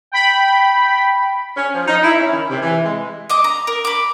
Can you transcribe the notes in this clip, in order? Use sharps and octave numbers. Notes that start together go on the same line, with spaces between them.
G5 B5
C#4
F3
D#4
E4
C#4
D#3
C3
E3
G#3
D#5 D6
A#5
A#4
B5 D6